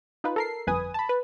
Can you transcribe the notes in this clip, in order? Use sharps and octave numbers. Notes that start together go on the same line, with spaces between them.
D#4 F4 B4
A4 A#4 C7
G1 F2 B4 G#5 D#6
A5 B5
B4